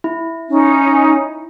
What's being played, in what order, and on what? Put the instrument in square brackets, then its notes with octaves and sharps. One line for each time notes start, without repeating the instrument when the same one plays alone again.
[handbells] E4
[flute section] C#4 D#4